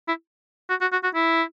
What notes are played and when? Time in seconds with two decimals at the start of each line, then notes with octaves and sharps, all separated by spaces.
0.08 E4
0.70 F#4
0.81 F#4
0.92 F#4
1.04 F#4
1.15 E4